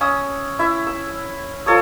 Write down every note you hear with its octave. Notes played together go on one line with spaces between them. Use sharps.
C#4 D#6 E6
E4 E5
E6
F3 A4 C#5 D#6